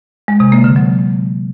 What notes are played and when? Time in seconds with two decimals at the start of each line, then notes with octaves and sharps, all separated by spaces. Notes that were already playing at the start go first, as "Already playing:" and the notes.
0.28 G#3
0.40 C3
0.52 A#3
0.64 D3
0.76 F#3